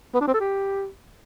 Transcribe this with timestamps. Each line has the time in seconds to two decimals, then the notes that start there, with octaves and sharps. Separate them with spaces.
0.14 B3
0.21 D4
0.27 C4
0.34 A4
0.40 G4